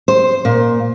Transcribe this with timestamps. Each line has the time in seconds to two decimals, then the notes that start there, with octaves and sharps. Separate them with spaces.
0.08 C5
0.45 A#2